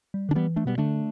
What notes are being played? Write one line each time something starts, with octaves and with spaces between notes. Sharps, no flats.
G3
D3 D4
E3 G3 B3
A3 D4
B2 G3 B3
D3 A3 D4